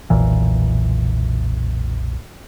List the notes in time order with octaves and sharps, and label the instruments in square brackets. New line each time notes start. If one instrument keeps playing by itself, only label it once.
[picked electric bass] F1 B1 A#2 E3